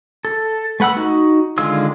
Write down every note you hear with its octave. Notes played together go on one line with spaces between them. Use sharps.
A4
A3 B4 F#5 B5 E6
D#4 F#4
D3 D#3 G#3 F4 E6